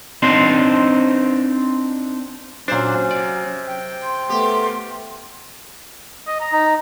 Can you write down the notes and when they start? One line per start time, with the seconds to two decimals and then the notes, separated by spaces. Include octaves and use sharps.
0.23 C4 D4 D#4 C5
2.68 A#2 F#3 C#4 D4 C5
3.11 C3 D5
3.67 G5
4.03 C6
4.29 A3 B3 G4
6.27 D#5
6.40 A#5
6.52 D#4